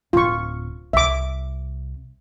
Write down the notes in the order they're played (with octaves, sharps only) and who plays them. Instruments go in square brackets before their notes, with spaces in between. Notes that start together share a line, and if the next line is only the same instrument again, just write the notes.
[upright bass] D1 [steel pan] F4 C#6
[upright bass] C2 [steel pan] E5 D6